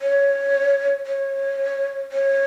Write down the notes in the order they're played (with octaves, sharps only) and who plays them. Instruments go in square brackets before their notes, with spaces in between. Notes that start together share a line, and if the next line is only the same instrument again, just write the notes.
[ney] C#5
C#5
C#5